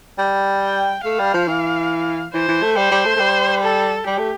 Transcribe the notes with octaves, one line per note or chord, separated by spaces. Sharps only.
G3
G5
A3 F5
G3
F3
E3
E3 C5
E3
A3
G3 C5
G3
A3
A3
G3
A4
G3 G4
A3